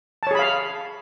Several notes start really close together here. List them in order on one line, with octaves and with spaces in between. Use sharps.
A5 C#5 G#4 B5 F5